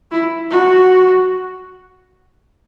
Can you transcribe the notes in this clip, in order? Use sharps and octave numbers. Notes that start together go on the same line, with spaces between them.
E4
F#4